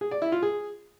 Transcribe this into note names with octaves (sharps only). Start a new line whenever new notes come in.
G#4
D5
E4
F4
G#4